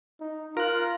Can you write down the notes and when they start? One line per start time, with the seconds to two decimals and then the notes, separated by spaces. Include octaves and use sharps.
0.21 D#4
0.57 F4 A#4 F#6